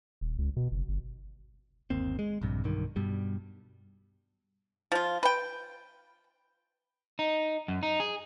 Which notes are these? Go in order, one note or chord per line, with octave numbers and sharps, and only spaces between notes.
D#1
C#2
B2
F#1
G1
G1 D#2 A#3 C4
G#3
A#1 G2 C3
B1 G2 D3 D#3
G2 B2 G3
F3 F4
B4 G5
D#4
F#2
D#4
G#4